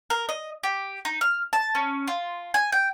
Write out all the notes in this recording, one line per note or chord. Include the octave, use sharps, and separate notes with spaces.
A#4
D#5
G4
D#4
F6
A5
C#4
F4
G#5
G5